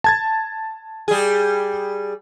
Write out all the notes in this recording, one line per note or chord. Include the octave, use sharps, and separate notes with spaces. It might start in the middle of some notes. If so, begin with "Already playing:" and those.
A5 G#6 A6
G3 G#4